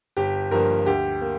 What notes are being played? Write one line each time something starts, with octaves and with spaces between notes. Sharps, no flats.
G1 G4
G2 F3 A#3 A#4
D2 G4
A#3